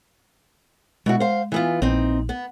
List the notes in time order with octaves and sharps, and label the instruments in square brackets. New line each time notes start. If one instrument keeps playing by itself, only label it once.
[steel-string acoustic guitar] B2 E4 F#4 [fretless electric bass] G#3
[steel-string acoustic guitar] C5 F5
E3 B3 F4
[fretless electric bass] A#1 [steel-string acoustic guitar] C4 D#4
[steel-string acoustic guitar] B3